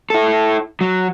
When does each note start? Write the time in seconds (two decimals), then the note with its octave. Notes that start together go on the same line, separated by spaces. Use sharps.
0.10 E4 A4
0.81 F#3